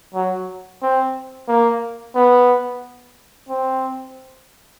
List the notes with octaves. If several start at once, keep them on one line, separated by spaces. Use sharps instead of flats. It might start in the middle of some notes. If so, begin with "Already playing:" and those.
F#3
C4
A#3
B3
C4